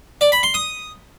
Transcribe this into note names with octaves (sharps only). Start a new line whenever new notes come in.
D5
B5
C6
D#6